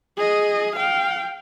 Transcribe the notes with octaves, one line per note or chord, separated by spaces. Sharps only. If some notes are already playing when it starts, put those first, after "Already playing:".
G#4 D#5
F5 G5